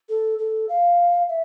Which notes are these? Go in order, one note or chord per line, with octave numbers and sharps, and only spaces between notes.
A4
A4
F5
E5